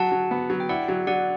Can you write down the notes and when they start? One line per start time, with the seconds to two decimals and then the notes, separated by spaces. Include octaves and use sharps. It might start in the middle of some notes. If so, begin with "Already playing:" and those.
Already playing: F#3 F#5 A5
0.12 F#3
0.31 B3
0.50 F#3
0.60 G5
0.69 E4 D5 F#5
0.88 F#3
1.07 F#3 D5 F#5